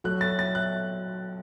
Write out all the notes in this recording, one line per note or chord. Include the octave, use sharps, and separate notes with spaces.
F#3 A3 F#4 A4 F#6
A6
A6
F#6